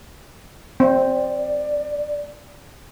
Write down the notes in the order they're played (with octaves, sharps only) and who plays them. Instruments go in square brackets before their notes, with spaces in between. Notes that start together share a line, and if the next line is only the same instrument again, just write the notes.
[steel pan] C4 [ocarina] D5